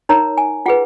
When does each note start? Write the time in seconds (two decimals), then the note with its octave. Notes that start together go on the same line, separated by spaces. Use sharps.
0.09 D#4 A#4 C#5 A#5
0.37 G#5
0.66 F4 G#4 B4 F#5